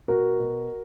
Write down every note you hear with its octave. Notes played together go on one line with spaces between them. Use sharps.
B2 F#4 A#4
B2